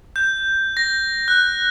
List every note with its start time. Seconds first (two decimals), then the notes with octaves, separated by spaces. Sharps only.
0.16 G6
0.77 A#6
1.28 F#6